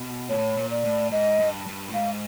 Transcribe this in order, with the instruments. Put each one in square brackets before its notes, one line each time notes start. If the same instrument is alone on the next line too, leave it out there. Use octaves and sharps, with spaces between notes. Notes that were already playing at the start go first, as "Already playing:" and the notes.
Already playing: [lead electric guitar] B2
[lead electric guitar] A2 [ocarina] C#5
[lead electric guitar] A#2
[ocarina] D5
[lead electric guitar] A2
[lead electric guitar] G#2 [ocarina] D#5
[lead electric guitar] G2
G2
A2
[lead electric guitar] G#2 [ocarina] F5